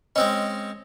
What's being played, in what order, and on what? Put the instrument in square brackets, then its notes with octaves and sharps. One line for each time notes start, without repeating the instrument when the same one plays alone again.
[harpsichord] G#3 C4 C#4 [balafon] D#5